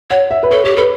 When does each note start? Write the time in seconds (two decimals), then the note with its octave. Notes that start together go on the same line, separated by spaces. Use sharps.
0.10 C#5 F#5
0.31 E5
0.43 B4
0.51 A4 C#5
0.64 G4 C#5
0.76 A4 B4